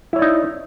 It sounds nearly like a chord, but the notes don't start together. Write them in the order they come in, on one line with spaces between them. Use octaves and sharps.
E4 C#5 D5 D#4